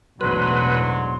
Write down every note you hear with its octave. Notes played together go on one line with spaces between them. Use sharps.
A1 E2 G#2 B2 D3 F#3 B4 C6